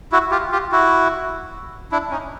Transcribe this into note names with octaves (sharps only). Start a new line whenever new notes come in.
E4 F#4
F4 G4
F4 G4
E4 F#4
D4 E4
C#4 D#4